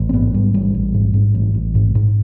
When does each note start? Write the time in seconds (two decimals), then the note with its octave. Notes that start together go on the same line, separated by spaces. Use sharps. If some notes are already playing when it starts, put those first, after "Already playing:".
Already playing: A1
0.09 C4
0.13 G#2 B3
0.34 G#2 G3
0.54 A1 G3
0.74 A1
0.94 G#2
1.14 G#2
1.35 A1
1.54 A1
1.75 G#2
1.95 G#2